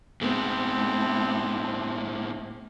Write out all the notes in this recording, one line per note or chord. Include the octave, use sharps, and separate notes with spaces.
A2 G#3 B3 C4